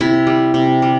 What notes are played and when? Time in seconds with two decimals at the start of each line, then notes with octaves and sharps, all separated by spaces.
0.01 C3 E4
0.27 G3
0.54 C3
0.82 G3